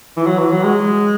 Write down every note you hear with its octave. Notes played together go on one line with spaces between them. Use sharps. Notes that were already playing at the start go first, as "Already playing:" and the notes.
E3
F#3
E3
F#3
G#3